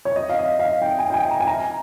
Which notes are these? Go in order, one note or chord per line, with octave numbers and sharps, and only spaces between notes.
C#5
D#5
F5
D#5
F5
G5
G#5
G5
G#5
A#5
G#5
A#5